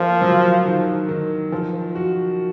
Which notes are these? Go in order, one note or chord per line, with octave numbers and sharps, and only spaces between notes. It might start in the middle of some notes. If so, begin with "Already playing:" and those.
Already playing: F3 A#3
F#3
D#3
D#3
F3
F#4